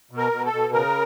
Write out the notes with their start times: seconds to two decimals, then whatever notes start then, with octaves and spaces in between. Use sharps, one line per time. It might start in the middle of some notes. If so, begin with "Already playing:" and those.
0.11 B2
0.18 A#4
0.32 B2
0.46 A4
0.53 B2
0.73 C#3 A#4